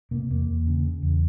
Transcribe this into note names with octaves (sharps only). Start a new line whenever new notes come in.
C3 A#3
E2 A#3
E2
C#3
C#3
E2